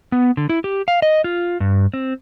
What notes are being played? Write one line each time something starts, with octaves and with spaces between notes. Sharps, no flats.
B3
D3
E4
G4
F5
D#5
F4
G2
C4